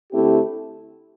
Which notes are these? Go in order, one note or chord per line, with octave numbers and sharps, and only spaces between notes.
D3 A3 C4 E4 G4